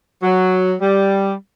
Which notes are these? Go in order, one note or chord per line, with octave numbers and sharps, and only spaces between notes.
F#3
G3